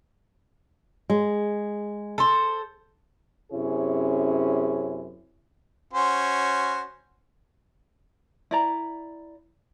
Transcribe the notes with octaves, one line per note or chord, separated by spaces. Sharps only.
G#3
A4 C5
F#2 C3 C#4 E4 G#4 C#5
C#4 F#4 C5
E4 D5 A#5